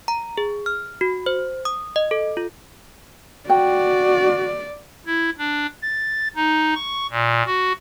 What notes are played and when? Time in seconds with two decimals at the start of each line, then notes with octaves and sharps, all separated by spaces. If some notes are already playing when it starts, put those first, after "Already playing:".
0.08 A#5
0.38 G#4
0.66 F6
1.01 F#4
1.26 C5
1.65 D#6
1.96 D#5
2.11 A4
2.37 F4
3.49 F#4 D5 G5
5.06 E4
5.38 D4
5.82 A6
6.36 D#4
6.75 C#6
7.10 A#2
7.46 F#4